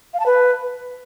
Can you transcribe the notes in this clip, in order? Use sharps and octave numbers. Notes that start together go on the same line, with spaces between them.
F5
A5
B4